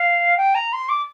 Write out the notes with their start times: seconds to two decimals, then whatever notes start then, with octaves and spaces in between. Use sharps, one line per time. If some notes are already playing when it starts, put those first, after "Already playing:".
Already playing: F5
0.37 G5
0.54 A#5
0.72 C6
0.88 D6